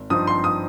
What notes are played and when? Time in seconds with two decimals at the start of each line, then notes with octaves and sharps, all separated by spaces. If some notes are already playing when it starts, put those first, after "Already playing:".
Already playing: G#1
0.10 G2 F3 C4 D#4 D#6
0.27 C6
0.44 D#6